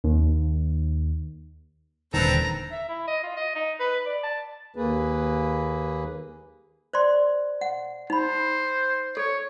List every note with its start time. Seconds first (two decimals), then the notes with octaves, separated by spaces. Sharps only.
0.04 D#2
2.14 D#1 A1 D3 D#3 C4 A4 B4 A#5
2.71 E5
2.89 E4
3.07 D#5
3.23 F4
3.36 D#5
3.55 D#4
3.80 B4
4.06 D5
4.23 A5
4.76 D#2 A#3 G#4 B4
6.93 C5 D5 C6
7.61 F#5
8.10 D#4 C5 B5
9.17 A4 C#5